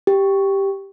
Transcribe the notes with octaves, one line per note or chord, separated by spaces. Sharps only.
G4